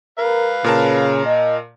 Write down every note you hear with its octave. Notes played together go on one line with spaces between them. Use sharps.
A#4 B4 F5
A#2 C#3 A#4 A5
D#5